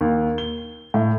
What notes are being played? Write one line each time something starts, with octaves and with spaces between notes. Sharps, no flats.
D#2
G7
A2